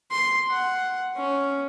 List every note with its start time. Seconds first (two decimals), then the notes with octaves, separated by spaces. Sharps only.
0.11 C6
0.50 F#5
1.17 C#4